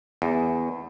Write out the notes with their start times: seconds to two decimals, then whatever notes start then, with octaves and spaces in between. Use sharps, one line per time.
0.22 E2